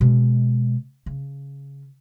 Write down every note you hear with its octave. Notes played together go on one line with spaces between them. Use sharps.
B2 G#3
C#3